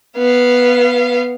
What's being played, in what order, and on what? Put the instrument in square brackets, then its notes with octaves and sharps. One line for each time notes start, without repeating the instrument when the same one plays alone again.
[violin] B3 F5